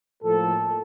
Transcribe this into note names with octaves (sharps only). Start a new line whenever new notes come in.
A2 F3 A#3 A4